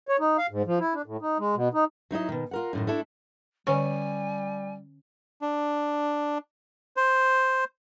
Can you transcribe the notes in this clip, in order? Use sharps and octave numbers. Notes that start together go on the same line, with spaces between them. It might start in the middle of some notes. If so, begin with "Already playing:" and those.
C#5
D#4
F5
G#2
F3
E4
D4
A2
D#4
G#3
B2
D#4
F#3 D#4 E4 D#5
B2 D#3
F4 A#4 F#5
F#2 A2 D#3
A3 D4 E4 A4
D3 G3 C#4 G#5
D4
C5